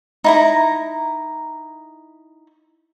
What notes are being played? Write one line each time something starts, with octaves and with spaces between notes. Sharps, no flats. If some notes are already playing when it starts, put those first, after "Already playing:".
D#4 E4 A#5